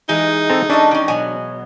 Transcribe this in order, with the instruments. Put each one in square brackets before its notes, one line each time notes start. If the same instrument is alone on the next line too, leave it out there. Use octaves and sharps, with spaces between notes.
[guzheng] E3 G#3 [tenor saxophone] D#4 [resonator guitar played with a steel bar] G#4
[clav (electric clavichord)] C4 A4 A#5
[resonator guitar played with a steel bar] C#4 A4 D#5 [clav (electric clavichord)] D4 [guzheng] E5
[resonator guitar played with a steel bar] D#3 C#4
[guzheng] B2 F#3 [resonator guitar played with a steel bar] G#5